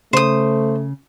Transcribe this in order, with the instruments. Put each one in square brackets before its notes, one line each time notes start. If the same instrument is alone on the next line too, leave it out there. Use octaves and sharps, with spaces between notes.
[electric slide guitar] C#3 [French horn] A3 [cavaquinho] C5 D#6